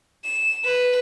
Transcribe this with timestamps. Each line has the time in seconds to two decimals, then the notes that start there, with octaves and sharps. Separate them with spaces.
0.25 E7
0.65 B4